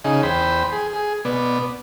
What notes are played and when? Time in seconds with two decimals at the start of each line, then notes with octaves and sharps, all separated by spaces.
0.04 C#3 D#4 G#4
0.23 E2 C5 G5 B5
0.72 G#4
0.93 G#4
1.25 B2 B3 D5